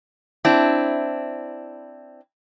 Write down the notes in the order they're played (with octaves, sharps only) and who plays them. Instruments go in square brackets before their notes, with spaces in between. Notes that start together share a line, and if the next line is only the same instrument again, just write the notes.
[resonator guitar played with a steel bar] C4 D4 E4